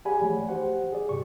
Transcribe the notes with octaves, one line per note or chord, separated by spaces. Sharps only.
G4 G#4 D5 F#5 G#5 B5
E3 F3 A3 G#4 C#5
F#4 G4 C5 F#5
G#4 D5
G2 C3 G4 C#6